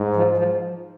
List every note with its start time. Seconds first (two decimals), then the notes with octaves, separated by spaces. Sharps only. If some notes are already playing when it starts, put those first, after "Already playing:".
Already playing: G#2
0.16 F3
0.37 F3